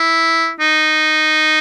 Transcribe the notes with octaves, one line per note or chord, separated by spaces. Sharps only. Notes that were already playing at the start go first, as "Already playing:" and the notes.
Already playing: E4
D#4